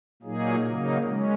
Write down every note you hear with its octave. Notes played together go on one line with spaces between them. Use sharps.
A#2 F#3 A#3 D#4 G#4
C#3 F#3 A#3 D#4
G#3 C#4